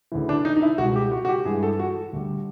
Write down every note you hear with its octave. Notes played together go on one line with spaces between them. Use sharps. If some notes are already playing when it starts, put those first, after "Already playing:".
D2 C#3 E3
D4
D#4
D#4
E4
C#2 B2 G#3 F#4
G4
F#4
F#4
G4
G2 E3 G#3 G#4
A4
F#4
D2 D3 G3